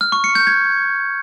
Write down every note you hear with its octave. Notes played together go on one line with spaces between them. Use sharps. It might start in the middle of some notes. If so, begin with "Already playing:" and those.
F6
C#6
C#7
G6
G#6